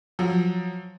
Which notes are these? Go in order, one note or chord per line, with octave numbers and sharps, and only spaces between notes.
F3 F#3